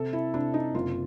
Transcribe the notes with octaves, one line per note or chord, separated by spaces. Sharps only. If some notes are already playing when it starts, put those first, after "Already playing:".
Already playing: C3 A4
E4
C3 D4
D#4
F#1 F4